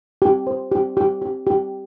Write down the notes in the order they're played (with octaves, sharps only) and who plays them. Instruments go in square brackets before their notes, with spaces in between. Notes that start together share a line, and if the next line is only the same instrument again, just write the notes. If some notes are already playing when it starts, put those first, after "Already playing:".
[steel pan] G4
C5
G4
G4
G4
G4